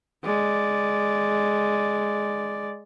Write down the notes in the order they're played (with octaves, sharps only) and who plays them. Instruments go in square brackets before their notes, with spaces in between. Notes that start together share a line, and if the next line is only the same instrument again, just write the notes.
[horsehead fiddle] G#3 D5